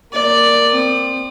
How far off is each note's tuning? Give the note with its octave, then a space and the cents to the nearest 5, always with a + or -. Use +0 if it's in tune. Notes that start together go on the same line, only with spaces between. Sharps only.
A#3 +0 D5 +0
C4 +0 D#6 -40